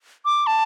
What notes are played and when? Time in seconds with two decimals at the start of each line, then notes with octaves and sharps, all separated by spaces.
0.25 D6
0.47 A5